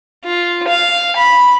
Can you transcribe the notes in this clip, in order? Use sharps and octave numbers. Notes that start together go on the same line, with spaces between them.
F4
F5
B5